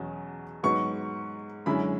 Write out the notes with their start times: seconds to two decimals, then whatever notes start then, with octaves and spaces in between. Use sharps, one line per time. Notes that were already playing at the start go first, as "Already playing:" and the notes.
Already playing: E2 B2 F#3 C#4
0.63 G#2 F#3 B3 C#6
1.66 F#2 D3 G#3 C#4 E4 B5